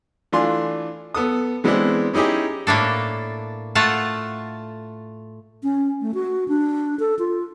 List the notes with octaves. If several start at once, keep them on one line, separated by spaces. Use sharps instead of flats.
E3 A3 D4 F4 G#5 C6
B3 A4 D#6
E3 G#3 B3 C4 D4 E4
C#4 D#4 E4 G4 G#4
A2 A#3 D4 A4
A3 F4 F#5 A5
C#4
A3
F#4
D4
A4
F4